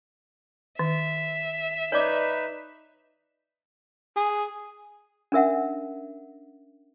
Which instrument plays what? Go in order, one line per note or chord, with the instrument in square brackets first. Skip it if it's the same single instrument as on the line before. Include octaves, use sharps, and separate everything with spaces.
[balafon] D#3 [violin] E5
[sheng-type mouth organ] D#4 B4 [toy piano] C#5 D5 D6
[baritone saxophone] G#4
[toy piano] C#4 D4 A#4 E5 F#5